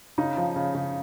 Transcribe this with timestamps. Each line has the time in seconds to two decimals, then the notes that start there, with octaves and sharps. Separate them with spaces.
0.18 C#3 D#4
0.37 F3
0.56 C#3
0.75 C#3